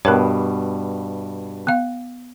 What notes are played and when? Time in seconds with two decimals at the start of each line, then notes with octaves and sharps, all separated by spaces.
0.05 G2 B2 B3 A#4 C#5
1.67 B3 F5